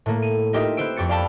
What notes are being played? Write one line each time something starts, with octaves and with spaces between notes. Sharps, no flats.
A2 A3 A#3
D#7
D#4 F4 G4 A#4 D#5 E5
B3 C4 C5 E6 D7
F2 G4 C#6 A6 C#7
D5 F5 G5 A5 B5 E6